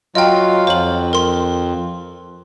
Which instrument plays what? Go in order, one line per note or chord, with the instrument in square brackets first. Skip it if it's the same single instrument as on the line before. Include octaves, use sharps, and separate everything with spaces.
[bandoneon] F#3 F4 [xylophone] D#5 G5
[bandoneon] F2 [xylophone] C5 F#7
[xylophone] A#4 C6